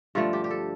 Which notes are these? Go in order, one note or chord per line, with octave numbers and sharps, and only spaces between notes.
G2 D3 F3 A3 F4
G4
G4
A4